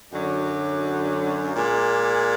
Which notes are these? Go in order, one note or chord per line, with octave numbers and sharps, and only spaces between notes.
F#2 D3 F#3 D5
A#2 G#3